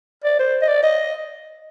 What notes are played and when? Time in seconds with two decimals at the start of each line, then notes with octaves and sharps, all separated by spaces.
0.24 D5
0.39 C5
0.62 D#5
0.68 D5
0.83 D#5